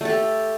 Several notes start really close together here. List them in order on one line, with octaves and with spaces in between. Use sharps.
A3 A4 G4